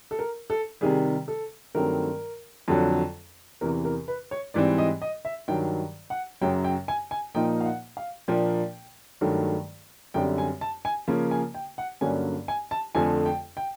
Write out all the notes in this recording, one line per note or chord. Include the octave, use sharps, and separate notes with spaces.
A4
A#4
A4
C3 D#3 G3 G#4
A4
G2 D#3 F#3 A3 C4 A#4
F2 D3 F#3
E2 C3 E3 A#4
A#4
B4
C#5
G#2 E3 G3 C4 D5
D#5
D#5
E5
G2 D#3 F#3 G5
F#5
F#2 C#3 F#3 G5
G5
G#5
G#5
A#2 F3 A#3 D#4 G5
F5
F#5
F5
A#2 F3 A#3 D4 G5
G2 D#3 F#3 A3
F#2 D3 G3 C4 G5
G#5
A5
G#5
C#3 F3 A#3 C#4
G#5
G5
F#5
G2 D3 F#3 A#3 C#4 G#5
G#5
A5
F2 D3 F3 A3 G#5
G5
G5